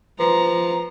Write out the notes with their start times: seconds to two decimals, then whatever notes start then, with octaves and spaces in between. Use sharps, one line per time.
0.20 F3 B4 A#5